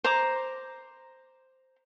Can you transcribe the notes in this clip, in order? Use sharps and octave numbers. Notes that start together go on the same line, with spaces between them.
C5 A#5 D6